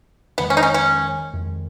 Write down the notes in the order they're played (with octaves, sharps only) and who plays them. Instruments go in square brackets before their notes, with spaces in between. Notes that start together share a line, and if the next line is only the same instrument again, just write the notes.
[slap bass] F2 D#3 G#3 [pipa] B3
[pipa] C#4
D#4
C#4
C#4
[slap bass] F2 D#3 G#3